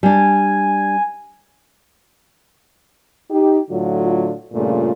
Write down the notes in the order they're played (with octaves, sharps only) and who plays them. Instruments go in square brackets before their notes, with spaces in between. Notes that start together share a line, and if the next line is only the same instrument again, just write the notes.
[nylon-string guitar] G3 D4 [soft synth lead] G#5
[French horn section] D#4 G4
A2 D3 F#3 F4
G2 A#2 C#3 A3 F4